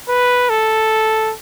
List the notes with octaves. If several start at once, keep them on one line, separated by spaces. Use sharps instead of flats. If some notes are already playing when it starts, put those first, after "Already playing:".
B4
A4